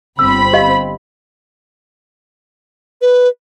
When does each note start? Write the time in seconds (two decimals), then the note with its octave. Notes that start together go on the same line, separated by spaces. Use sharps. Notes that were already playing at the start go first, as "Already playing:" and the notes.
0.19 G1 C4 B5 E6
0.53 G4 D#5 F5
3.02 B4